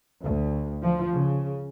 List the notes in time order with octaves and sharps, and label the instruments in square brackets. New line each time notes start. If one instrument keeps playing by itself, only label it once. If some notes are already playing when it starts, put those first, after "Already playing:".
[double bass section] D2
F3
C#3